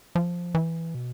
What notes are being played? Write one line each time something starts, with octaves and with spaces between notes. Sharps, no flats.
F3
E3
B2